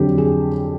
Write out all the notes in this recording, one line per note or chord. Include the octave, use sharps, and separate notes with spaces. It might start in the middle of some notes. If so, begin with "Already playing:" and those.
Already playing: F2 D3 F#3 G4
G#4